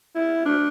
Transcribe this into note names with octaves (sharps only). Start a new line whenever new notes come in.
E4
D4